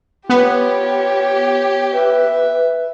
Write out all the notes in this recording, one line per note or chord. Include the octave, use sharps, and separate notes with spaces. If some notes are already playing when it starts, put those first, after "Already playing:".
B3 F4 G4 C#5
B4 E5